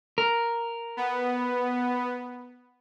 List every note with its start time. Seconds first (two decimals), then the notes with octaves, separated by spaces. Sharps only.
0.18 A#4
0.97 B3